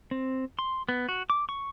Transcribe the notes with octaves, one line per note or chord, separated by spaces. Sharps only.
C4
C6
B3
F#4
D6
C#6